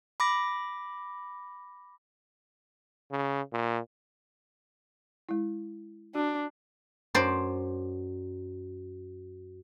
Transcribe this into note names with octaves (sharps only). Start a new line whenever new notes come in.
B5 D6 A#6
C#3
A#2
G#3 E4
D4 F#4
F#2 C5 D5